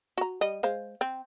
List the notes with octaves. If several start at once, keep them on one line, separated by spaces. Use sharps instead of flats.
F#4 A#5
G3 D#5
G#3 C5 F5
C4